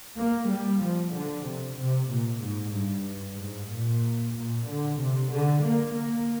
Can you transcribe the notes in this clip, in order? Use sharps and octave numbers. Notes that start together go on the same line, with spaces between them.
A#3
G3
F3
D3
C3
C3
A#2
G#2
G2
G#2
A#2
A#2
D3
C3
D3
A#3
A#3